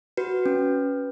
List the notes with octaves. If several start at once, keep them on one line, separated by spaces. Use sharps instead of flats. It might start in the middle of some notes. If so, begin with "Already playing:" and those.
F#4 B4
C#4